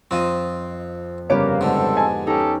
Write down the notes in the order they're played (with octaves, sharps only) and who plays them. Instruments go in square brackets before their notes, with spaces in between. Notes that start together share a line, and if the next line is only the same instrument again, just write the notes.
[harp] F2 D#5 D#6 [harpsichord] C4 F4
[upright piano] G1 C#3 C#5 [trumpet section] A#3 [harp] B3 G4 D7
[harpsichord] G#2 D3 [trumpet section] C4 A4
[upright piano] D#5 G#5 A5
[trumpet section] C#4 G4 A4 [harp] D#4